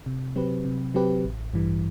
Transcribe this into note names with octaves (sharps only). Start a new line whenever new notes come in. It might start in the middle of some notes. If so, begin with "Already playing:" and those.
C3
F#3 C4 G4 B4
C3
F#3 C4 G4 B4
A1
G2 E3 G3